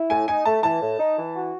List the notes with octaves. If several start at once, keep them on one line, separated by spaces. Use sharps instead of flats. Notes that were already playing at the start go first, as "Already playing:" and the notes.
Already playing: E4
A2 G#5
D#4 G#5
A3 A5
E3 A5
A2
D#4
E3
F#4